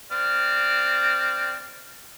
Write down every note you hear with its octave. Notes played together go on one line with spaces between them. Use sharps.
C4 D5 F6